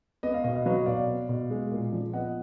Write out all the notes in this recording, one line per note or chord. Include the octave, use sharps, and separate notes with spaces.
B3 D#5
F5
B2 D#5
F5
F#3 B4 D#5
B2 D5 F5
B3
B2
G#3
A#2
F3
B3 D#5 F#5